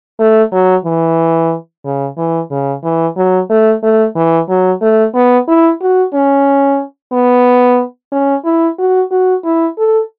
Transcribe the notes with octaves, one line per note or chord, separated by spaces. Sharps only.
A3
F#3
E3
C#3
E3
C#3
E3
F#3
A3
A3
E3
F#3
A3
B3
E4
F#4
C#4
B3
C#4
E4
F#4
F#4
E4
A4